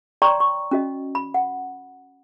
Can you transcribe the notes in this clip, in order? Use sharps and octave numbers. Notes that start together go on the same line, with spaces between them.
C#5 D5 G5 A#5 C6 C#6
C#6
C#4 F#4 D#5
B5
F#5